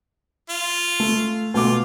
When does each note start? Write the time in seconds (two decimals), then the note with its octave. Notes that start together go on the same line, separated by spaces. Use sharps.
0.50 F4
1.00 A3
1.54 B2 A3 F4 D6